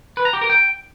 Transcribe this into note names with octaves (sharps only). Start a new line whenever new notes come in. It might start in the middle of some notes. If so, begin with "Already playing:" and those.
B4
A#5
G4
A#4
G5